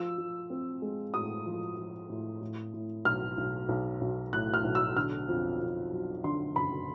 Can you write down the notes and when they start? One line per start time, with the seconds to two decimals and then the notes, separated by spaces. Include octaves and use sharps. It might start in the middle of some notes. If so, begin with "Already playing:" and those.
Already playing: F3 E6
0.18 F3
0.50 C4
0.82 G#3
1.14 A2 D#6
1.46 F3
1.77 F3
2.09 A2
2.41 A2
2.73 A2
3.05 B1 F6
3.38 B1
3.69 B1
4.01 B1
4.33 A2 F#6
4.54 F6
4.64 B1
4.75 E6
4.96 D3 F6
5.28 F2
5.61 F2
5.92 F#3
6.24 D3 C6
6.56 F#1 B5